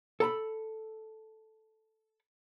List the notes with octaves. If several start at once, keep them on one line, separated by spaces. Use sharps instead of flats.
A4 A#5 B5